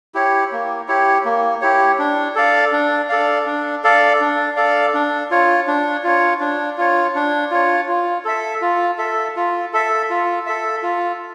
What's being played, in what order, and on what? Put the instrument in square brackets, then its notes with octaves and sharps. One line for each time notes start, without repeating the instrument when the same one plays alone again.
[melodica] E4 G4 C#5
A#3
E4 G4 C#5
A#3
E4 G4 C#5
D4
A4 D5 F5
D4
A4 D5 F5
D4
A4 D5 F5
D4
A4 D5 F5
D4
F4 C#5
D4
F4 C#5
D4
F4 C#5
D4
F4 C#5
F4
A4 E5
F4
A4 E5
F4
A4 E5
F4
A4 E5
F4